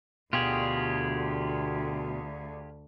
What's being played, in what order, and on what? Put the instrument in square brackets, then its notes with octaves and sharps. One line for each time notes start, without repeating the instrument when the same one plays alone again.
[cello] D2 D3 [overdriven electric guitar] B2 [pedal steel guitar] F4 G4 G#4